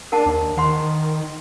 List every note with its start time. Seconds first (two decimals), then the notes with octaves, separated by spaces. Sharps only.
0.12 D4 A#4 F#5 A5
0.26 D#2
0.57 D#3 C5 F#5 C6